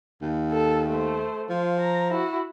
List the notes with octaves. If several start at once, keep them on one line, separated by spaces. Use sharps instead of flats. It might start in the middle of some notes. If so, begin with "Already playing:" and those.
D#2
A4
A3 C5
F3 F4
A#5
E4 F#4